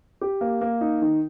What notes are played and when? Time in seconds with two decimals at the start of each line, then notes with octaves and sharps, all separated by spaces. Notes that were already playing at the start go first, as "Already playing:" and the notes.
0.21 G4
0.41 A#3
0.61 A#3
0.81 D#4
1.02 D#3